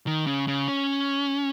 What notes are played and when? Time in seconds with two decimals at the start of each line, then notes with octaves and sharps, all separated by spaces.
0.07 D#3
0.27 C#3
0.48 C#3
0.68 C#4